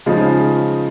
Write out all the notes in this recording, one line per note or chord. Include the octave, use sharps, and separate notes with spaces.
C#3 F3 G#3 D#4